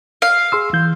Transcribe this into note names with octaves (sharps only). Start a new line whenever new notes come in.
F5
G#4 C6 E6
E3 G6